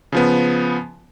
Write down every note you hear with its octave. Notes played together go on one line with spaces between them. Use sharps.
C#3 F3 B3